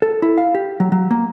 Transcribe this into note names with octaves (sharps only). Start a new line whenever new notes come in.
A4
E4
F5
G4
F#3
F#3
A#3